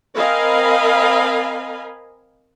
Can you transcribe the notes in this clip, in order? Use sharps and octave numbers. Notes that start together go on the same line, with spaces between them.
C4 A#4 D#5 F5 G#5 B5